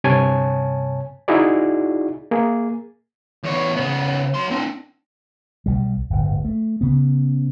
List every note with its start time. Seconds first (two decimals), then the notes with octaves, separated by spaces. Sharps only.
0.04 G2 C3 C#5 G#5 A5
1.28 D#4 E4 F#4 G#4 D5
2.31 A#3 G#4
3.44 E2 C#5
3.76 C#3 B3
4.34 F#3 C6
4.51 C4 D4
5.66 B1 G3
6.10 D1 G1
6.44 A3
6.81 C#3 B3